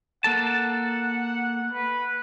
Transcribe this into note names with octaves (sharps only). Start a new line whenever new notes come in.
A#3 A4 F#5 A5
B4